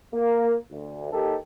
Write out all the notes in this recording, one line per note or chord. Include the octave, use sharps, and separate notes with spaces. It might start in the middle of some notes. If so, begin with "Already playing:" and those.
A#3
D2
D#2 D#3 G4 A4